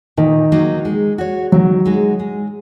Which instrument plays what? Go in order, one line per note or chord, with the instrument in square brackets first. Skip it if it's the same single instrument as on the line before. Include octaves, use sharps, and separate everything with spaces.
[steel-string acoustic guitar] A#2 [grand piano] D#3
[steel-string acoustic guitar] F#3 A#3 D#4
G#3
F#4 C#5
[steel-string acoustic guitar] D#3 [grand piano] F#3
[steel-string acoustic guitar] G#3 D#4 F#4
G#3